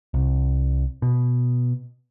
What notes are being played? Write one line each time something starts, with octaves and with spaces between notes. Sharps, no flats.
C2
B2